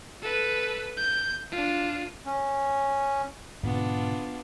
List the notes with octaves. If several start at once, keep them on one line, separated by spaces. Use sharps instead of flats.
A4 B4
G6
D4 F4
C#4
G#2 B2 D3 B3 D4 F4